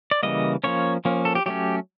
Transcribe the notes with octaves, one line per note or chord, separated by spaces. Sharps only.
D5
C#3 E3 G3 A#3 D#5
F3 A#3 C#4 C#5
F3 A#3 C#4
A4
G4
F#3 A3 C#4 G4